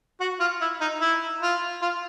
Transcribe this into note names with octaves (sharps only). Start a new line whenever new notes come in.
F#4
F4
E4
D#4
E4
F4
F4